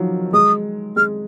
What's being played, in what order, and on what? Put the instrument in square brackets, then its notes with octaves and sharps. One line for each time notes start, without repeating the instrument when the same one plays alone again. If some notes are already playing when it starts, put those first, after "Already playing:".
Already playing: [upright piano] D#3 F3 F#3
[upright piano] G#3 [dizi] D#6
[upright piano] G#3 [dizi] F6